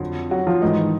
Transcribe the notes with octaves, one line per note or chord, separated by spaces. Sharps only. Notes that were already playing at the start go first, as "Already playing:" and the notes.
Already playing: F2 D3 F#3
F#3 F#4
F3 F4
G#2 D#3 E3 G#3 D#4